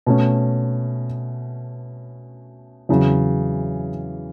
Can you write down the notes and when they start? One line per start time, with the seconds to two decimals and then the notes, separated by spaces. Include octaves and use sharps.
0.07 B2 A3 C#4
2.89 E2 C#3 F#3